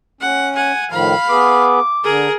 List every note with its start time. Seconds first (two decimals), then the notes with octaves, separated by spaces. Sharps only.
0.21 C#4 F#5
0.55 F#5 G#5
0.90 A2 D#3 F3 F5 B5
1.29 B3 G#4 B4 D6
2.04 D3 G#4 A#4